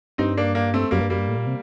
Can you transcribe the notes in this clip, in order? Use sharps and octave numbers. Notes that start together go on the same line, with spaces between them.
G2 C4 D#4
A#3 D4
A#3 D4
A3 C4
F#2 G3 A#3
G2
F#2 G3 A#3
G2
A2
A#2
C3